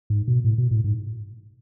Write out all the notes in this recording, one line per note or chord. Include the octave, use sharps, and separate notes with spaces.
G#2
B2
A2
B2
A2
G#2